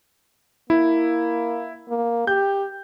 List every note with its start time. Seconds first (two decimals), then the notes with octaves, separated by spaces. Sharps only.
0.70 A#3 E4
1.89 A#3
2.27 G4 G6